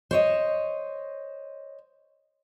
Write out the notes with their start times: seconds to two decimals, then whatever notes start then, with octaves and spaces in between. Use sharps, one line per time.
0.11 C5 C#5 D#5